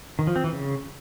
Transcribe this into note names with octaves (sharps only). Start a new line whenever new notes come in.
D#3
F3
C4
E3
C#3